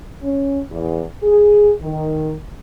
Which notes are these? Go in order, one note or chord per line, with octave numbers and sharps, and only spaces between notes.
C#4
E2
G#4
D#3